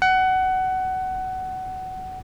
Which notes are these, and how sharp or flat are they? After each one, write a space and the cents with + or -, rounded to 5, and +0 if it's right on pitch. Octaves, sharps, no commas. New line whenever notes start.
F#5 +20